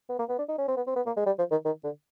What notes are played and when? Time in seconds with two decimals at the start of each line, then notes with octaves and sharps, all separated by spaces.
0.09 B3
0.19 A#3
0.29 B3
0.39 D4
0.49 D#4
0.58 C#4
0.68 C4
0.77 B3
0.87 C4
0.96 B3
1.06 A#3
1.16 G#3
1.26 G3
1.38 F3
1.52 D#3
1.65 D#3
1.84 D3